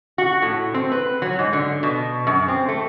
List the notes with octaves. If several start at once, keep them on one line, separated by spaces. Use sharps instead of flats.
F#4
A2
C4
B4
F#3
G#2
D3
B2
F#2
C4
A3